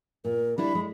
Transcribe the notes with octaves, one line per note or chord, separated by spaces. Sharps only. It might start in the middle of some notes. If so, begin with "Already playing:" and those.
A#2 A#4
G3 D4 E4 B5
G#3